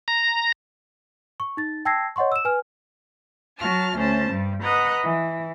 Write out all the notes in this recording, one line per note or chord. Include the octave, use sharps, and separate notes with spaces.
A#5
C#6
D#4 A6
G5 A5 E6 G#6 A#6 C7
C#5 D#5 F#5 C6 C#6
E6 E7
B4 G#5 F6
F#3 F#4 A5 F6
D2 C#4 C5 A5
G2 G3
B4 D#5 F#5 A#5 F#6
E3